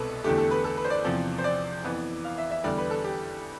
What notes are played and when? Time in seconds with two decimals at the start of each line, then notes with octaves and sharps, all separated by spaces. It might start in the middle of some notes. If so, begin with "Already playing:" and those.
Already playing: C2 B2 C4 A4 B4
0.24 E2 D3 A3 G4
0.38 A4
0.51 B4
0.64 A4
0.77 B4
0.84 C5
0.90 D5
1.04 E2 C3 F3
1.38 C5
1.44 D5
1.84 F2 E3 B3
2.25 F5
2.38 E5
2.51 E5
2.64 E2 D3 G3 D5
2.78 B4
2.90 A4
3.04 G4